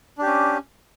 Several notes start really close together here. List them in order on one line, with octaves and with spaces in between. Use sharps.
D4 G4 C#4